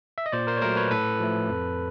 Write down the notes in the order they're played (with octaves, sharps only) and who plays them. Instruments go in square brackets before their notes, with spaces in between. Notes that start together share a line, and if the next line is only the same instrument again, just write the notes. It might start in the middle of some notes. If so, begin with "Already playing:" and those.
[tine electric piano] E5
D#5
A#2 C5 D5
A#4 C5
C#5
F#3 A3 A#4 C5
B4 C#5
A2 A4 B4
F3 A3
F2